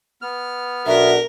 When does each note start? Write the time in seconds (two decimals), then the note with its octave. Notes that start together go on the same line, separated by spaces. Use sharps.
0.22 B3 F6
0.86 B1 D4 F#4 A#4 E5